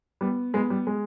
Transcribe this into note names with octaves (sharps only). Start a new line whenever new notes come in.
G3 B3
G#3 B3
G3
G#3